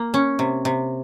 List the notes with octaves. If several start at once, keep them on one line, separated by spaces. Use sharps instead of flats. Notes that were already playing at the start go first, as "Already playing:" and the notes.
Already playing: A#3
C#4
C3
C3